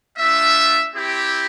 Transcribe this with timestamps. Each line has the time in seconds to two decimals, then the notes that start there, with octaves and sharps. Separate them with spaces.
0.17 A3 D4 F4 E5
0.94 C4 E4 G4